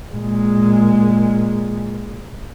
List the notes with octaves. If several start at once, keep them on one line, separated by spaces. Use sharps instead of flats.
A#2 G#3